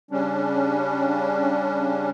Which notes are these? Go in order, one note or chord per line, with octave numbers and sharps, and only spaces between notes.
C#3 G3 C#4 D4